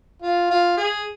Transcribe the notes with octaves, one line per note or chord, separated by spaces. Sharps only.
F4
F4
G#4